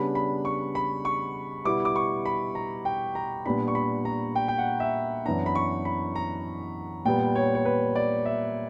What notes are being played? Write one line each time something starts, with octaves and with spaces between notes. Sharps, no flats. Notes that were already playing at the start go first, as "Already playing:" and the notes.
Already playing: C#3 G3 B3 D4 B5
B5
C#6
B5
C#6
B2 G3 B3 E4 D6
D6
C#6
B5
A#5
G5
A#5
A#2 G3 B3 D4 B5
C#6
B5
A#5
G5
G5
F#5
E5
F#2 E3 B3 D4 A#5
B5
C#6
B5
A#5
A#2 G3 B3 G5
C#5
C#5
B4
D5
E5